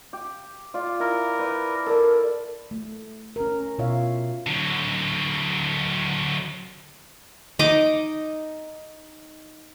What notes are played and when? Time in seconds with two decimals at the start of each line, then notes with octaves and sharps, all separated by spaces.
0.13 G4
0.74 F4 D5
1.00 E4 A#4
1.39 B4 D5
1.86 A4 A#4 D5
2.71 A3
3.36 C#4 A#4
3.79 B2 F4 C#5 E5 F5
4.47 D3 F#3
7.59 D#4 D#5 D6